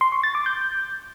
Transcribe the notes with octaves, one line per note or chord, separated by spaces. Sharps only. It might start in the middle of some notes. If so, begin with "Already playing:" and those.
C6
C#6
A6
D6
G6